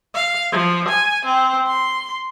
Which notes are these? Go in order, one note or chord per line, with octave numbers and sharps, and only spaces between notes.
F5
F3
G#5
C4
C6